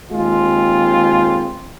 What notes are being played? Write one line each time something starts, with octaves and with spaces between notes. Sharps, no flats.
D#2 G#3 C4 F4